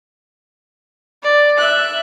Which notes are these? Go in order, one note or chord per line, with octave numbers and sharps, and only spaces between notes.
D5
E5 F#6